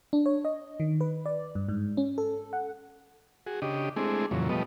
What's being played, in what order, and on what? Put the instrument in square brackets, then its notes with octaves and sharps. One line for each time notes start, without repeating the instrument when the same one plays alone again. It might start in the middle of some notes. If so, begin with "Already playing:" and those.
[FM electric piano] D4
C#5
D#5
D#3
B4
D5
G2
G#2
C#4
A4
F#5
[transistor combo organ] F#4 G#4
C#3 D4 G4 D#5
G#3 A3 C4 D4 E4 G#4
F2 A#2 C#3 E3 F#3
B2 F3 G3 A3 B3 D#5